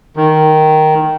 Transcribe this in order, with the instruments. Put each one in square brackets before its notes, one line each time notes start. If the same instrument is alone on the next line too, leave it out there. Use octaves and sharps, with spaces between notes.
[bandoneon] D#3